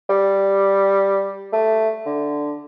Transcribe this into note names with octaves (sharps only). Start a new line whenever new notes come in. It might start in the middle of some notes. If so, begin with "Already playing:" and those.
G3
A3
D3